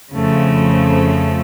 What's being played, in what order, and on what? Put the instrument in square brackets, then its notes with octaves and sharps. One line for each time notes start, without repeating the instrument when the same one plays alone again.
[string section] F2 C#3 F3 A3